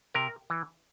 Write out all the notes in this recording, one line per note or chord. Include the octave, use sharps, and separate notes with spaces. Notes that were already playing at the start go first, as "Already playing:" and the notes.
C3 A#4
E3